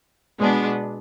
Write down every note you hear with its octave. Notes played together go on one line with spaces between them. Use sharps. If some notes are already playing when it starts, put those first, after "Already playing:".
B2 G#3 B3 D4